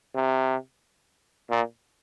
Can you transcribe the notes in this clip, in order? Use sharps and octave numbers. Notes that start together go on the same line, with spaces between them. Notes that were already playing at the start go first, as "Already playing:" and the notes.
C3
A#2